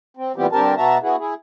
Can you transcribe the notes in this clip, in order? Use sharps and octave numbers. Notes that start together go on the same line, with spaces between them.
C4
A#2 E3 G3 B3 C4 G4
G2 D3 C4 G4 A#4 A5
B2 B3 F#4 E5 A5 A#5
B3 E4 F#4 G#4
E4 G#4